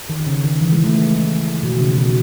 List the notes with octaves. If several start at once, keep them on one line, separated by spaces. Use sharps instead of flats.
D#3
D#3
C#3
D#3
E3
G#3
A3
G#3
B2
D#3
C#3
B2